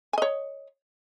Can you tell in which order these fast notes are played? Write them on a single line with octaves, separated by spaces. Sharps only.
G#5 D#5 C#5